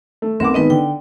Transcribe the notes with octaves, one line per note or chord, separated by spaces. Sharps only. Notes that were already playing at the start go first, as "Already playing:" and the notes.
A3
B1 C4 A#4 F#5 D6
G#1 B3 D#4 B4 D#5
D3 G5